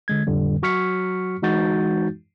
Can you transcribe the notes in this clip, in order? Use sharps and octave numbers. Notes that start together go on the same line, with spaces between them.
D3 G#3 G#6
F2 A2 D3 G3
F#3 F#4 C#6 F6 B6 C#7
E3 G#3 D#4 F#4 G6 A6